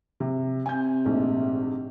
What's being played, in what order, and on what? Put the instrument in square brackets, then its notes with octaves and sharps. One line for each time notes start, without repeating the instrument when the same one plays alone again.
[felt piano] C3
[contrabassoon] C3 [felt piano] G#5 G6
[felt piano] A#1 G#2 A3